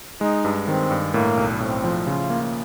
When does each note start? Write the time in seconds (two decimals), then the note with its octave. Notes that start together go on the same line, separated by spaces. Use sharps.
0.21 G#3 D#4
0.45 G2
0.67 D#3 C4
0.91 G2
1.14 A2 A#3
1.37 B1
1.60 A2 C4
1.84 F3
2.07 C#3 F4
2.30 A#3